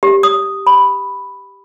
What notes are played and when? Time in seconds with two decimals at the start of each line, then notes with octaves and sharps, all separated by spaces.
0.03 G4
0.23 D#6
0.67 B5